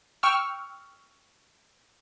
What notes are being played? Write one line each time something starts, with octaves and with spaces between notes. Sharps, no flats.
G5 C#6 E6 F6